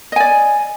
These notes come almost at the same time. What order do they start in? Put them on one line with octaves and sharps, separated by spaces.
D#5 G#5 D5